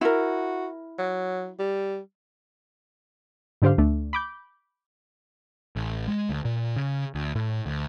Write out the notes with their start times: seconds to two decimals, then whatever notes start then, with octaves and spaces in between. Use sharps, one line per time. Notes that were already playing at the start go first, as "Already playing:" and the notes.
0.01 E4 F#4 A#4
0.99 F#3
1.59 G3
3.62 G#2 D3 G4 C5 F5
3.78 D2 A3 D4
4.13 B5 D6 G6
5.76 A1
6.08 G#3
6.29 D2
6.45 A#2
6.76 C#3
7.15 D2
7.35 A2
7.66 D2